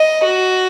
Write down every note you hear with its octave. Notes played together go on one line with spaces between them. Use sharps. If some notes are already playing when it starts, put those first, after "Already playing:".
Already playing: D#5
F#4